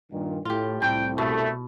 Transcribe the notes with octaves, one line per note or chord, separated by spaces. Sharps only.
G2 A#2 D#3
A2 F4 G4
C2 A2 G5
B2 A3